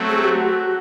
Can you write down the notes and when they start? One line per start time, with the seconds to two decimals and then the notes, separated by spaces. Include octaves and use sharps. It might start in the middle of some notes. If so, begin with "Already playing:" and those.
Already playing: F#3 A3 C4
0.09 G#4
0.16 G4
0.24 F#4